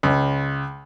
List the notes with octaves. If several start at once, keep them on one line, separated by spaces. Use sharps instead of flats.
C#2